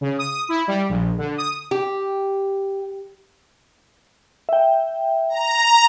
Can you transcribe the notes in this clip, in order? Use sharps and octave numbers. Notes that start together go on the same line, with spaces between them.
C#3
D#6
E4
G3
A#1
D3
D#6
G4
E5 G5
A#5